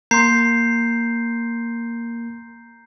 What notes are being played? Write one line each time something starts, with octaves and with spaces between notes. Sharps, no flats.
A#3 A#5 C6 G6 C7